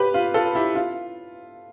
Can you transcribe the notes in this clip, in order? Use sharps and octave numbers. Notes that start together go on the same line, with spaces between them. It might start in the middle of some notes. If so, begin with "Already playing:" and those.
Already playing: G4 B4
F4
F4 A4
E4 G4
F4